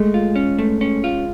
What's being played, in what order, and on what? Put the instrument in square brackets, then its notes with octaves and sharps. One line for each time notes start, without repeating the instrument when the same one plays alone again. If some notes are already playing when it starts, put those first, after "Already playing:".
Already playing: [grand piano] G#3 [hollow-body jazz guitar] A3
[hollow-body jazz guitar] F4
C#4
A3
C#4
F4